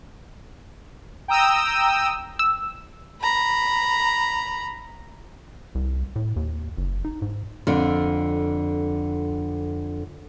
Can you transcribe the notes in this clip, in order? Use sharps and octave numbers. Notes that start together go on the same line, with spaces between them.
G5 A#5 D#6 E6
E6
A#5 B5
C2
A2
D#2
F#1
D#4
G#2
F2 D3